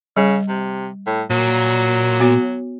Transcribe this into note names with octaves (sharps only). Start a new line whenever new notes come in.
C#3 G3
C3
A2
A#2 F#3
B3 F#4 C#5